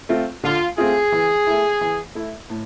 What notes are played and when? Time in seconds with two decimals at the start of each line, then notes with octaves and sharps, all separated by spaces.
0.09 A3 C4 F4
0.43 D3 F4
0.78 A3 C4 F4 G#4
1.12 E3
1.47 A3 E4
1.81 E3
2.15 A3 E4
2.50 A2